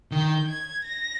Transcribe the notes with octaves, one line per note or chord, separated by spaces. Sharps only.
D#3 G6
G#6
A#6